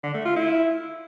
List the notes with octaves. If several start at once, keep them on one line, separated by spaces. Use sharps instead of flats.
D3
A3
F4
E4